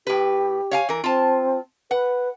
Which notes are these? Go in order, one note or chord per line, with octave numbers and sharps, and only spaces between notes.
A2 G4 B4
C#5 F5 G#5
E3 A#4
C4 F4 A5
B4 F#5